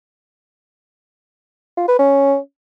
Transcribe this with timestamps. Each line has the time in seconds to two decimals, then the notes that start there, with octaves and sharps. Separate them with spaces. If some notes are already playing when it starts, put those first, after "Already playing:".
1.77 F4
1.88 B4
1.99 C#4